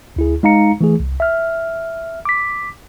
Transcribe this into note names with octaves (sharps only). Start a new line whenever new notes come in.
D2 E4 G#4
G#3 D#4 F5 A#5 C#7
E3 A3 G#4
C2
E5 F6
D6 B6